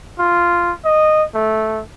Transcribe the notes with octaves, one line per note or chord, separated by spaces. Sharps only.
F4
D#5
A3